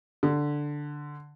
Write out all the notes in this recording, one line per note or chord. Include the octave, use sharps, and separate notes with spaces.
D3